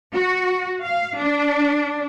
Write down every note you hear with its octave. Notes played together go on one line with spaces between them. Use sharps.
F#4
F5
D4